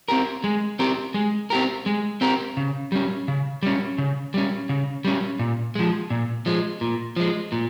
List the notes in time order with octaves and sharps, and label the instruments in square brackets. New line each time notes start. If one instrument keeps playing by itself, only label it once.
[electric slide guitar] C4 G4 A#4
G#3
C4 G4 A#4
G#3
C4 G4 A#4
G#3
C4 G4 A#4
C#3
G3 C#4
C#3
G3 C#4
C#3
G3 C#4
C#3
G3 C#4
A#2
F3 G#3
A#2
F3 G#3
A#2
F3 G#3
A#2